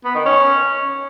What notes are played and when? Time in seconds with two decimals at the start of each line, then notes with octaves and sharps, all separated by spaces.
0.05 B3
0.15 D#3
0.26 C#4